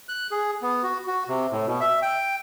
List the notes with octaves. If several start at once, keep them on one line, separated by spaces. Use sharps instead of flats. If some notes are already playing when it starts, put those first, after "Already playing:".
F#6
G#4
B3
F#4
F#4
C3
A2
B2
E5
G5